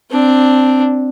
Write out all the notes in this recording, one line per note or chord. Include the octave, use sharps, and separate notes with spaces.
C4 D4